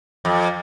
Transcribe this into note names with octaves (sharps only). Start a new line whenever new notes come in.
F2